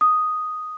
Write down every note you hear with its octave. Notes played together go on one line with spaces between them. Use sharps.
D#6